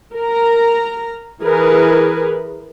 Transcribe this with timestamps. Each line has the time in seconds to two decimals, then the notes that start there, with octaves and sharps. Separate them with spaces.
0.15 A#4 A#5
1.42 E3 G#4 A#4 B4